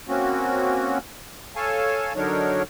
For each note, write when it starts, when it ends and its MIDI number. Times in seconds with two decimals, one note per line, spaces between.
0.08 0.98 58
0.08 0.98 60
0.08 0.98 61
0.08 0.98 66
1.56 2.13 69
1.56 2.13 73
1.56 2.13 77
1.56 2.13 80
1.56 2.13 81
2.16 2.63 50
2.16 2.63 54
2.16 2.63 62
2.16 2.63 63
2.16 2.63 70
2.16 2.63 73